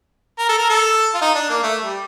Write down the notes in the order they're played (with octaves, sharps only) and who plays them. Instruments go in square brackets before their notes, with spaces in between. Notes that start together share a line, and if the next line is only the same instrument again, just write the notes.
[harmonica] A#4
A4
A#4
A4
F4
D#4
D4
A#3
A3
G3